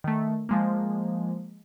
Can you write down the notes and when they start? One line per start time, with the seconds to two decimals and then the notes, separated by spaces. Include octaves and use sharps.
0.04 D#3 A3
0.49 F3 G#3 A#3